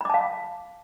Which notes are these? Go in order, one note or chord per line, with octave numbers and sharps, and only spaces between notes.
F5 A5 B5 D6